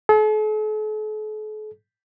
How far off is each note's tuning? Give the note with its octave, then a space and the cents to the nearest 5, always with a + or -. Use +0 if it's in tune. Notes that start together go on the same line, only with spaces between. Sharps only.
A4 -45